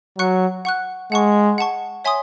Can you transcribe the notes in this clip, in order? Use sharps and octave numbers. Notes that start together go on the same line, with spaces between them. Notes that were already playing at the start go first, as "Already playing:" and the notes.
F#3 F#5 C#6 F#6
F#5 C#6 F#6
G#3 F#5 A5 C#6
F#5 A5 C#6
C#5 E5 G#5 C6 D#6